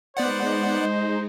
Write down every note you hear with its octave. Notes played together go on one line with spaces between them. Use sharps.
G#3 B3 D#4 C5 D5 F#5